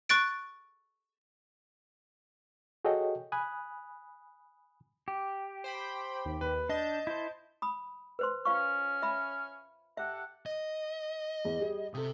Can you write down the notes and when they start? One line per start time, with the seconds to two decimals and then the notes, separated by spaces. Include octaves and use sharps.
0.09 C#6 F#6 A6 D7
2.85 F#4 G#4 A4 C#5 D#5 G5
3.32 G#5 B5 D#6 F#6
5.08 G4
5.64 C5 G5 B5
6.25 D#2
6.41 D#2 B4
6.69 D4 D#5 A5 G6
7.07 E4 C5
7.62 B5 D#6
8.19 B4 C5 C6
8.45 C#4 F4 F5 C#6 F6
9.03 E5 B5
9.97 G4 A4 E5 F#5
10.46 D#5
11.45 E2
11.60 G3 G4 G#4
11.94 C3 A4 D#6